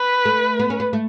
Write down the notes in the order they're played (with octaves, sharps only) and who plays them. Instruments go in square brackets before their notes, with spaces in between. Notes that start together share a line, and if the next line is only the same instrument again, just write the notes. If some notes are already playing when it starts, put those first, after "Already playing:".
Already playing: [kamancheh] B4
[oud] A3
B3
C#4
B3
A3